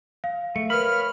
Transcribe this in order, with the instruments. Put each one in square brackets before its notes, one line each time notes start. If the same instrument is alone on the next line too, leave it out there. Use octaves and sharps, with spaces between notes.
[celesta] F5
[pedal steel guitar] A3 [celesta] C#7
[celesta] A#4 B4 [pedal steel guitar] C#5 F5 B5 [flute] F6